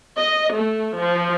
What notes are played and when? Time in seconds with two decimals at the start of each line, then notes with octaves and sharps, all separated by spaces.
0.19 D#5
0.56 A3
0.99 F3